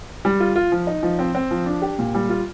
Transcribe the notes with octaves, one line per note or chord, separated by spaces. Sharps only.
G3
F4
F4
F3
D#4
F3
C4
C4
F3
D4
G4
A#2
G3
F4